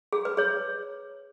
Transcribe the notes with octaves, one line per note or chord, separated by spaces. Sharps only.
G#4
B4
G#4 C#5